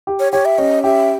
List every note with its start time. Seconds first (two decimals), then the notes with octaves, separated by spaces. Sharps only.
0.07 G4
0.19 C#5
0.32 G4 C#5
0.45 E5
0.58 C#4 D#5
0.84 G4 E5